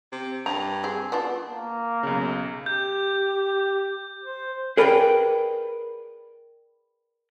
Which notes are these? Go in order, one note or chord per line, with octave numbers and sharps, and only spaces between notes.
C3
G2 A#5
C4 G#4
B3 D4 F4
A#3
B1 C#3
G4 G6
C5
G#4 A#4 B4 D5 F#5 G5